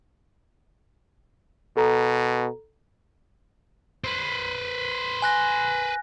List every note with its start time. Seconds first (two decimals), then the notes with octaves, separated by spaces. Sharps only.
1.77 B2 A4 A#5
4.04 B4 C5
5.22 G#5 F#6 A#6